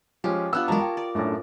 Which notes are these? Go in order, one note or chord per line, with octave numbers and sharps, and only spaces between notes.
F3 G#3 C#4 G4
B3 D4 F4 E6 F#6
E3 F#3 G#3 A#4 C#5 A5 A#5
G5
D5
F#2 A2 A3 D4 A4